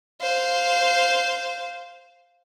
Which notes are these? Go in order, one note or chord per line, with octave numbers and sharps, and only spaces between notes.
C5 F5